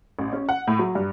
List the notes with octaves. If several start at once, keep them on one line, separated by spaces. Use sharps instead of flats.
A1
C#4
F#5
A2
F#3
G2